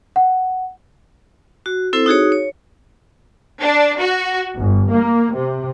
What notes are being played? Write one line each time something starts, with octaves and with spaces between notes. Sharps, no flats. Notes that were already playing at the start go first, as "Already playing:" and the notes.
F#5
F#4
C4 E4 A4 C5
D#4 F#4 G#4 C#5
C#5
D4
F#4
G1
A#3
C3